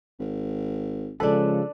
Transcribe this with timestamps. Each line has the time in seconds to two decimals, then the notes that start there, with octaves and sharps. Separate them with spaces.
0.19 G#1
1.20 C#3 F3 G#3 D4 A4 B4